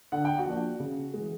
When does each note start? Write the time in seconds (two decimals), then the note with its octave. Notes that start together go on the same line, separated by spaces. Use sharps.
0.12 D3 F#5
0.25 G5
0.38 F#4 F#5
0.46 F3 A#3 D4
0.80 C#3
1.14 E3 G#3